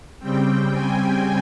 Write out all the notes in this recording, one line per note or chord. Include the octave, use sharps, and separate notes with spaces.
C#3 G3 C4 G5
G#5